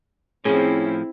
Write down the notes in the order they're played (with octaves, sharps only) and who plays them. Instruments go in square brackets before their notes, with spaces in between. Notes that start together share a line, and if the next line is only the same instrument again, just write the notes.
[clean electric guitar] A2 F3 [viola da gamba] C4 E4 [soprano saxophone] C#4 [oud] G#4